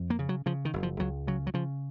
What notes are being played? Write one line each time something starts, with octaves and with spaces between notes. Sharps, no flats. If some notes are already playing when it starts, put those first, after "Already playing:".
Already playing: F2
A#3
C#3
F#3
C#3 F3
D#3
F#1
F3
C#2 F#3
C#3 F#3
F#3
C#3 F3